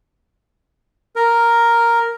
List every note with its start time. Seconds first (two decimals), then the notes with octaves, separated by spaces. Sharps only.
1.16 A#4